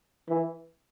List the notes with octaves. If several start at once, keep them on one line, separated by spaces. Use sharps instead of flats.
E3